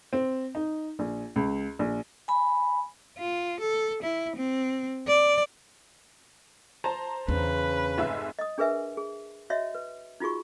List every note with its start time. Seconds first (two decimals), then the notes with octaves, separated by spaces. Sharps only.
0.13 C4
0.55 D#4
0.99 A#1
1.36 C#2
1.79 A#1
2.28 G#5 B5
3.19 F4
3.61 A4
4.03 E4
4.36 C4
5.08 D5
6.84 C5 A5 A#5
7.28 E2 C#3 D4 B4
7.98 F1 G#2 E5
8.39 D#5 D#6
8.58 D4 G#4 A#4 B4 E5 G#5
8.97 G#4
9.50 F#4 C#5 D#5 E5
9.75 B4
10.20 D#4 F4 F#4 G#4 C#6